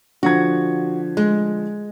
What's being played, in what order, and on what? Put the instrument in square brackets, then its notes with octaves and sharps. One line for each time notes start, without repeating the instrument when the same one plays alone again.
[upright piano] D3 F3 G#6 [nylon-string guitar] F#4
[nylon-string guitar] G#3